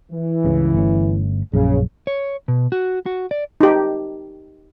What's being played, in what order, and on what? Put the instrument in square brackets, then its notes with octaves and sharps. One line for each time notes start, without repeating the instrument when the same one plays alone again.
[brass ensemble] E3
[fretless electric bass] C#2 G2 C#3
G1 A3 C#4
[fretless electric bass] A#1 F#2 [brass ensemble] C#3
[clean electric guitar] C#5
B2
F#4
F#4
D5
[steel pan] D#4 G4